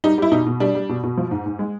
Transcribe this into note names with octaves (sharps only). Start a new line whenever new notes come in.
G3 D#4
G3 E4
B2 D#4
B2
G3 D4
G3
B2
B2
F3
G#2
G#2
G#3